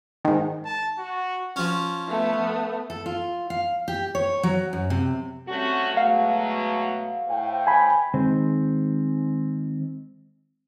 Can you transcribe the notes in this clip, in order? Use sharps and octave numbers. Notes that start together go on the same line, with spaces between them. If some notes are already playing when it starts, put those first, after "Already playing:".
G#2 D#3
A5
F#4
F3 C#4
A3 B3
A4
F4
F5
G4
C#5
F#3
F#2
C3
G3 A3 C4 C#4 F#4
B2 F#3 G#3 A3 F5 F#5
A2 C5 G5
G#5 B5
D#3 G#3 C4 C5